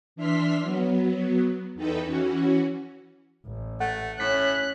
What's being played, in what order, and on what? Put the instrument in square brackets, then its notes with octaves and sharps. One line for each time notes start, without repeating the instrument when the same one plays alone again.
[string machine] E3 D4 E5 C6 F6 B6
F#3 B3
E2 D#4 A4 B4 G5
E3 C#4 F#4
[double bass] A1
[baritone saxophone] A3 [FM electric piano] F#5
[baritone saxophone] A2 [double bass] C#4 [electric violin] F#6 [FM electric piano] B6